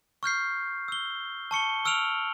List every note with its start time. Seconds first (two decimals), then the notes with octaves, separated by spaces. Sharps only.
0.23 C#6 F6 G6 C7
0.88 E6 G7
1.51 A5 C#6 C#7 G7
1.85 C#6 E6 F6 D7 F7 F#7